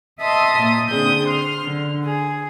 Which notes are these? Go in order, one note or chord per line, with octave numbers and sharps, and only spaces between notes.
D#5 E5 A5 C6 D#6
A#2 D#6
D3 C4 D4 G#4 D#6 G6
C6 F6
D3
G#4